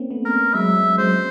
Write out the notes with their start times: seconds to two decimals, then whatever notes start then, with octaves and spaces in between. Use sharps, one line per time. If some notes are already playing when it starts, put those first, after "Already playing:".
Already playing: A#3 C4 C#4
0.11 A3 B3
0.25 A#4
0.54 F#3 G#3 E5
0.76 F#3 G#3
0.98 F#3 G#3 C5